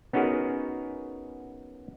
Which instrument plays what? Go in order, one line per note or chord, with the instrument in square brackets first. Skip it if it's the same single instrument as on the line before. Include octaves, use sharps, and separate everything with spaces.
[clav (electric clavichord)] B3 C#4 D#4 F#4 G#4 A#4